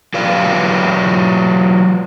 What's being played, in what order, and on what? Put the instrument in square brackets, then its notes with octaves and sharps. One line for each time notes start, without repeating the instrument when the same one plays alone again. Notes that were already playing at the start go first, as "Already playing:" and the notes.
[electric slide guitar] F#3 F4 G4 B4 D5 F5